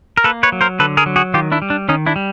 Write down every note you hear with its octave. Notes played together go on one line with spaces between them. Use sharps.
A#4
A#3 A4 B4
B4 C#5
F#3
A#4 C5
D3 A4 B4
G#4 A#4
F#3
F#4 G#4
D#3 F4 G4
D4 E4
G3
D4
D#3 C#4 D#4
D4 E4
G3